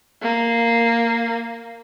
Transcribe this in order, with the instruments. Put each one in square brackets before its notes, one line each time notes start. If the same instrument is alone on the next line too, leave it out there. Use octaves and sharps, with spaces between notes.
[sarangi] A#3